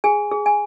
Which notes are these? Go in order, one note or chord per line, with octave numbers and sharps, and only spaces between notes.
G#4 G#5
G#4
G#5